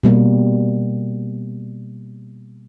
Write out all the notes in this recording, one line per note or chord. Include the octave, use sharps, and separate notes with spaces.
B2 G3 A#3